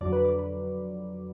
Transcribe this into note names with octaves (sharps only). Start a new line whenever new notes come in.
F2 D3 F#3 D5
B4
D5
B4